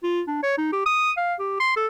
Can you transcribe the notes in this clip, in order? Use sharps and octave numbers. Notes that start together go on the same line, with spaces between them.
F4
D4
C#5
D#4
G4
D#6
F5
G4
C6
A4